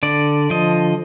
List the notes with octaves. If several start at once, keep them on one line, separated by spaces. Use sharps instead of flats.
D3 D5
F3 D#5